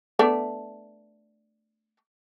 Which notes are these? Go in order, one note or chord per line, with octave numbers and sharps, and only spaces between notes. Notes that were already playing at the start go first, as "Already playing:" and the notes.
A3 B3 D4